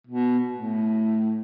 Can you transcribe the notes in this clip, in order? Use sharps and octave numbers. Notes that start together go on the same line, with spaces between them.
B2
A2